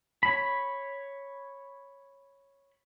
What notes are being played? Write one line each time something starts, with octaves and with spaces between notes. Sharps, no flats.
C#5 B5